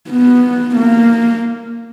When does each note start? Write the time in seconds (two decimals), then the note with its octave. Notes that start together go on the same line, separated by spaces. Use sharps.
0.10 B3
0.76 A#3